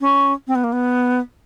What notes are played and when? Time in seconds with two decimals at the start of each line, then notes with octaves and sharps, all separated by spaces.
0.01 C#4
0.47 C4
0.55 B3
0.64 A#3
0.72 B3